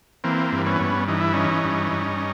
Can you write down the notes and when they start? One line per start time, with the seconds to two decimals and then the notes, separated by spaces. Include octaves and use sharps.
0.24 E3 A#3 C4
0.52 G2
0.66 B3 C#4
0.80 G2
1.08 E3 D#4
1.21 E4
1.33 E3 C#4 D#4
1.64 G2
1.92 G2